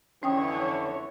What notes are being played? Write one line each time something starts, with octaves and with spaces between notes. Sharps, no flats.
F2 D3 E3 C#4 C#5 G5 D#6